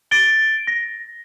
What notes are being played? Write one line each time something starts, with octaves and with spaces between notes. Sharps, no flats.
A6 D7 G7
A#6